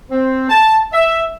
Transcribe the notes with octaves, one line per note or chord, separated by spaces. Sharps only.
C4
A5
E5